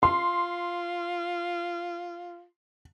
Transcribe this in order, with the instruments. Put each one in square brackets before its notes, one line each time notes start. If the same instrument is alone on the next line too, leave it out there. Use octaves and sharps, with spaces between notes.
[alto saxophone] F4 [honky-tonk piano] C6